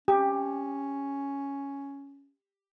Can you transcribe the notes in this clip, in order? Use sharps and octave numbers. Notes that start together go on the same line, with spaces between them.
C#4 G4